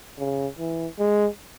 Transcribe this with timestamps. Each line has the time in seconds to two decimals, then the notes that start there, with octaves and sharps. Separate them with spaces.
0.19 C#3
0.59 E3
0.99 G#3